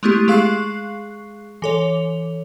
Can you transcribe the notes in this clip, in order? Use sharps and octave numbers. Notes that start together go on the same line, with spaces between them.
G#3 A3 B3 E4 G4
G#3 G#4 F5 C#6 F#6 C7
E3 A4 C#5 F7